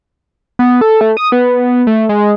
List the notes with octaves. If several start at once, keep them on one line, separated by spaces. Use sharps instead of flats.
B3
A4
A3
D#6
B3
A3
G#3